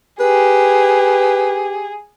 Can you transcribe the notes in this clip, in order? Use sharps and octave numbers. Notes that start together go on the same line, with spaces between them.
G4 G#4 B4